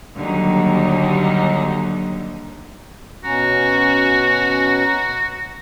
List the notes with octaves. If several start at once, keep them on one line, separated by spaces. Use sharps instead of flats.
D#2 D3 F#3 G3 D#4
B2 C#4 F#4 A#5